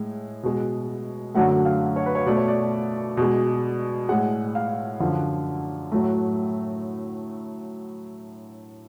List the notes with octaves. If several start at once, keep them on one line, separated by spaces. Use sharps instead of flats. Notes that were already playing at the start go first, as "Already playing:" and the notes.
Already playing: A2 G#3
B2 G#3
F#2 D3 F#3 A3 F#5
F5
C#5
B4
C#5
B2 A3 D5
C#5
D5
B2 G#3
A2 G#3 F#5
F5
F#2 D3 F3
A2 F#3 A3